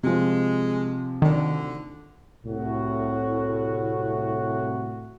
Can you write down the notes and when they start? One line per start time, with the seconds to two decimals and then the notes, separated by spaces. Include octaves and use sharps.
0.03 C3 F3 G#3
1.22 D2 D3 D#3
2.46 C2 A2 F#4